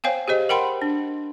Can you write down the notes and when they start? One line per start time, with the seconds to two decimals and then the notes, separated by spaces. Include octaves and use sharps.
0.04 C5 C#5 F5 G5 G#5
0.28 G4 G#4 C5 D#5
0.49 A#4 F#5 G5 B5 C6
0.82 D4